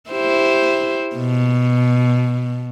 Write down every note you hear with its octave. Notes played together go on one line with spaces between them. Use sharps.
E4 G4 C5
B2